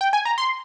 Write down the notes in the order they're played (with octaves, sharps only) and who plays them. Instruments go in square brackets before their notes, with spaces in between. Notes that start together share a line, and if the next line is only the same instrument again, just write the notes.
[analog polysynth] G5
G#5
A#5
C6